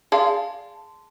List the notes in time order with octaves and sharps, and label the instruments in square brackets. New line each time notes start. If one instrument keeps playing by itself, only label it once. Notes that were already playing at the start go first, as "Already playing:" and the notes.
[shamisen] G#4 D5 F5 [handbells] A5 C6